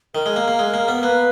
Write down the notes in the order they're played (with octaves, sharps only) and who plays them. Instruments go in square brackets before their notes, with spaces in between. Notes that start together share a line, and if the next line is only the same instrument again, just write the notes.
[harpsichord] D#3 [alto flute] A#4
[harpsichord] G#3
A#3
A#3
G#3
A#3
B3
[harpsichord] A#3 [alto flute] B4